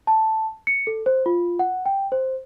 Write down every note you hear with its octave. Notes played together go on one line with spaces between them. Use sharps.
A5
C#7
A4
C5
F4
F#5
G5
C5